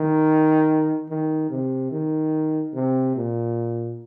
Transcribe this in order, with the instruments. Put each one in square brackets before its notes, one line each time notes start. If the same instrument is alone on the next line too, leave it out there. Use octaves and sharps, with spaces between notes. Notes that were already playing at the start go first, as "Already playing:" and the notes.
Already playing: [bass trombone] D#3
D#3
C3
D#3
C3
A#2